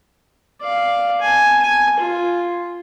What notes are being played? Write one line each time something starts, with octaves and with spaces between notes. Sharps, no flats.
D5 F5
G#5 A5
G#5
F4